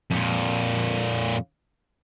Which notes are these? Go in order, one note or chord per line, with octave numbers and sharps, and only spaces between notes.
F2 A#2